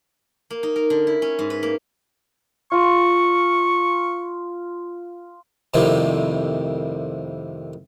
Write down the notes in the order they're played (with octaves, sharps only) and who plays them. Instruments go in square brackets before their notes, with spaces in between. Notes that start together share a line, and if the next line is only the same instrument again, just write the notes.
[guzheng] A#3
D#4
A#4
D3
E4
C#4
G#2
B4
A#3
[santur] F4 [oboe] C#6
[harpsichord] F2 A2 C3 D#3 G3 A#3